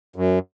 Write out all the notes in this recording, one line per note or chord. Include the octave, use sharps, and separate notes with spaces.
F#2